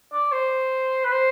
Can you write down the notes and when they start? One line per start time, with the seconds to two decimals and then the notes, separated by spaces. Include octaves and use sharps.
0.13 D5
0.32 C5
1.04 B4
1.12 C5